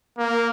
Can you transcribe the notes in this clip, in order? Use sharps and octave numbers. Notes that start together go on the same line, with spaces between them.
A#3